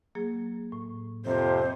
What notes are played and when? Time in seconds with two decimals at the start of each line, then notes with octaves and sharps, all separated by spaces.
0.15 F#3 A#3 G#4
0.72 A2
1.25 F2 C3 C5